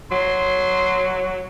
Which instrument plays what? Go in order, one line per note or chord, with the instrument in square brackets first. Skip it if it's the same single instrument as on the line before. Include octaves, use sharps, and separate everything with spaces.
[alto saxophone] F#3 [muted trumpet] C6